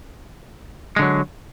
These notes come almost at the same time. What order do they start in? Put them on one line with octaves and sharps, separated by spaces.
G#3 D3 F#3